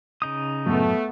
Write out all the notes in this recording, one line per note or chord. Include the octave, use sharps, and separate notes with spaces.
C#3 D#4 D#6
F#2 A2 F#3 A3 B3